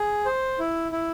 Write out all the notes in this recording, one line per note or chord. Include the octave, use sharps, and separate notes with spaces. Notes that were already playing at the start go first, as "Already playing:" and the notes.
Already playing: G#4
C5
E4
E4